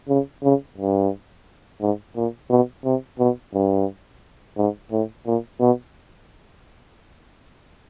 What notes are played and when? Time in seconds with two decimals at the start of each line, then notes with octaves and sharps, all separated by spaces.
0.09 C#3
0.43 C#3
0.78 G2
1.81 G#2
2.16 A#2
2.50 B2
2.85 C3
3.19 B2
3.54 G2
4.57 G#2
4.92 A2
5.26 A#2
5.60 B2